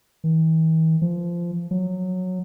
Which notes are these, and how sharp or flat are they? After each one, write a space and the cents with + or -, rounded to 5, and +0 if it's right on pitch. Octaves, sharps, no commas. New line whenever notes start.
E3 -45
F3 -15
F#3 -10